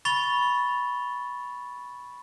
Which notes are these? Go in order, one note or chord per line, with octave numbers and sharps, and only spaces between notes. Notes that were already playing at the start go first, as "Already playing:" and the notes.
B5 C#6 A6 F7 G7